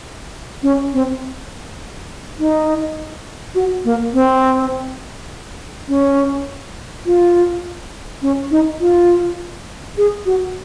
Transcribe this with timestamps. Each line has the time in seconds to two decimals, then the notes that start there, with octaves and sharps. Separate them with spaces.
0.63 C#4
0.93 C4
2.39 D#4
3.55 F#4
3.85 A#3
4.13 C4
5.88 C#4
7.06 F4
8.22 C#4
8.51 D#4
8.80 F4
9.98 G#4
10.26 F#4